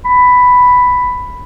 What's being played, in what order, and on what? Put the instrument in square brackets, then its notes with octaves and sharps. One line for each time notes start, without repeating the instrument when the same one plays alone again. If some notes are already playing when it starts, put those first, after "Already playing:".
[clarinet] B5